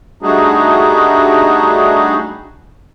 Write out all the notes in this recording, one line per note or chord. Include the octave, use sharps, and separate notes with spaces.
G3 A3 D4 D#4 F#4 G#4